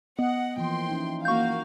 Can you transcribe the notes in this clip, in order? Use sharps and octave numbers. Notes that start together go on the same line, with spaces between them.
B3 D#5 F#5
E3 F3 A#3 G5 C6
C#4 D#4 E4
A#3 F#4 F5 C#6 G6